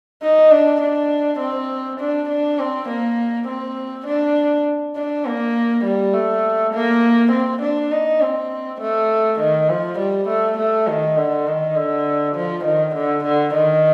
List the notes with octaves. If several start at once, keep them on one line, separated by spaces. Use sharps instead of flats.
D#4
D4
D4
C4
D4
D4
C4
A#3
C4
D4
D4
A#3
G3
A3
A#3
C4
D4
D#4
C4
A3
D#3
F3
G3
A3
A3
D#3
D3
D#3
D3
F3
D#3
D3
D3
D#3